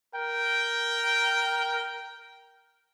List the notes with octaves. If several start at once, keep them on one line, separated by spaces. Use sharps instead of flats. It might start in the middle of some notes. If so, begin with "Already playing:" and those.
A#4 G5